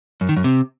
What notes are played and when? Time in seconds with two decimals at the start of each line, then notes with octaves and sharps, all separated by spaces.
0.21 F#2
0.29 D#3
0.37 F#2
0.44 C3